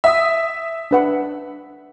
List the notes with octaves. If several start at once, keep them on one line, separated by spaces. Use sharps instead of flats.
E5 D#6
D4 B4 F#5